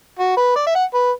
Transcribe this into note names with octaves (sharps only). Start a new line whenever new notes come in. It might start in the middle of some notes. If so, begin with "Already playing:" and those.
F#4
B4
D5
E5
F#5
B4